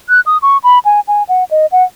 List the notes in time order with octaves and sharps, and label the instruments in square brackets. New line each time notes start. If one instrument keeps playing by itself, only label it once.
[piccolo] F#6
D#6
C#6
B5
G#5
G#5
F#5
D#5
F#5